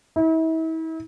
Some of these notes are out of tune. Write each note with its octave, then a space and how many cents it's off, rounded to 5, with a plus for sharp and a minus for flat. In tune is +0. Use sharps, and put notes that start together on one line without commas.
E4 -40